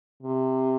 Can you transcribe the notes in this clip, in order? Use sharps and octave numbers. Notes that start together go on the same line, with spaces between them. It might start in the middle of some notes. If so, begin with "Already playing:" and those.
C3